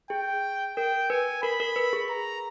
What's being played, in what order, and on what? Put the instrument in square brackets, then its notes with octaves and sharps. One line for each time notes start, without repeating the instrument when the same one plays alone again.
[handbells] G#4 [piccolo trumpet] G5
[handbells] A#4 [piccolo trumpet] G5
[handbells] B4 [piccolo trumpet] G#5
[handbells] A#4 [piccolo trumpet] B5
[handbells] A#4
B4
G#4
[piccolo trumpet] A#5